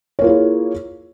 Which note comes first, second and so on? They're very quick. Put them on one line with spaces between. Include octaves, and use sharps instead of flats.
C#5 A#3 F4 E4 G#4